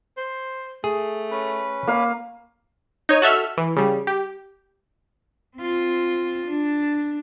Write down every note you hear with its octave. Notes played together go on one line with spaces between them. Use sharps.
C5
A3 G#4
C#4 B4
A#3 F5
D#4 C#5 D#7
F#4 A4 E5 F6
E3
C#3 G3
G4
C4 F4
D4